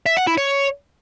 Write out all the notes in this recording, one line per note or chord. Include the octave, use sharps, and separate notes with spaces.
E5
F#5
E4
C#5